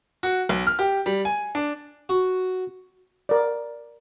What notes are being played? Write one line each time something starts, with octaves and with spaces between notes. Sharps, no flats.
F#4
B1
F6
G4
G3
G#5
D4
F#4
A#4 D5